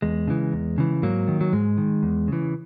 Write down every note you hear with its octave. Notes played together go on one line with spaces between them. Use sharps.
E2 G#3
C#3 E3
E2
C#3 E3
G#2 F#3 A#3
D#3
F#3
G#2 G#3
D#3
E2
C#3 E3